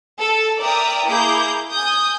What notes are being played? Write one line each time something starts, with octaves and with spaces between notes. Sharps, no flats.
A4
A#4 D5 E5 G5 A#5 D#6
A#3 E4 G#4 A#5 D6 G6
G#5 D#6 G6